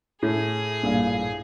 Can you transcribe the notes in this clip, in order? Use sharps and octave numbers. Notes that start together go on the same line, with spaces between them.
A2 G#4 D#6
A#1 G2 A#2